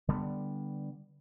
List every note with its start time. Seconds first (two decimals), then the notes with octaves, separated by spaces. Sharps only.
0.08 D3 G3 B3